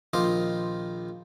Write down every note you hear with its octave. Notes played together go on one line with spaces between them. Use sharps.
A#1 D#3 F4 C5 D#5 D6